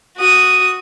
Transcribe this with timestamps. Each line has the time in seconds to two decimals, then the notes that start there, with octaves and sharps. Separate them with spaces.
0.17 F#4 D#6